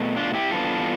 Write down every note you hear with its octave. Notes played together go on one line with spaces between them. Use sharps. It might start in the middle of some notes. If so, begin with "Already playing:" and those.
Already playing: B2 A3
D4 F4
E4 G4
G2 E3 B3 D4 F4 A4